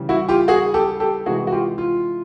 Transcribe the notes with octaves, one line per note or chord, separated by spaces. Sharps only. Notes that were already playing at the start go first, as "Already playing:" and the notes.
Already playing: C#3 E3 G3
E4 F#4
F4 G4
F#4 G#4
G4 A4
G4 A4
C3 E3 G#3 F#4 G#4
F#4
F4 G4
F4